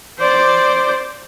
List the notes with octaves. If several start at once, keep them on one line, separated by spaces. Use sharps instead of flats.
C5 D5